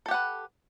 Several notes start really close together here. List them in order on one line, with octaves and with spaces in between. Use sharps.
A4 G4 F#5 B4